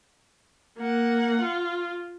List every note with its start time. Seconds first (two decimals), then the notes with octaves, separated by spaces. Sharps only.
0.78 A#3 F#5
1.41 F4